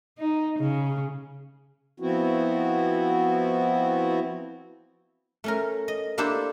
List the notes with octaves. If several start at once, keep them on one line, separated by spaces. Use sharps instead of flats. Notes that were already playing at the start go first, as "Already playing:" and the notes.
D#4
C#3
F3 B3 C4 E4 F#4
A3 C#4 A#4
D#5
A#3 D4 E4 G4 A4 C5